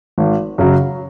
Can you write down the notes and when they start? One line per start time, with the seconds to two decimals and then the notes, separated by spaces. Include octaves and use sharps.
0.18 G#1
0.58 F#2 C#3 F#3